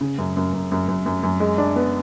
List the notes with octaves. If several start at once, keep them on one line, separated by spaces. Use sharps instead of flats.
C#3
F#2
F#2
F#2
F#2
F#2
F#2
F#2
G#3
D4
B3